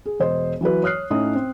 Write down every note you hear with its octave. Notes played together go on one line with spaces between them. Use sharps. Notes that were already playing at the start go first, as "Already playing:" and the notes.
G#4
E1 C5 D#5
E3 F#3 F#4 B4
C#5 D#6 F6 F#6 C7
A2 C#4 D#4 D#6
C4